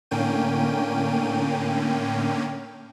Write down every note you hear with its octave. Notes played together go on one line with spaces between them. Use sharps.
A2 D3 A#3 C#4 G5 D#7